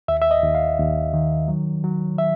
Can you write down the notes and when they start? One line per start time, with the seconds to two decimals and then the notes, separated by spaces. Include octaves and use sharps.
0.08 D#2 E5
0.22 E5
0.31 D#5
0.44 D#2
0.55 F5
0.78 D#2
1.14 D#3
1.48 F#3
1.84 F#3
2.18 E5